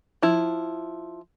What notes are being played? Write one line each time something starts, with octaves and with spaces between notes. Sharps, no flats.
F3 E4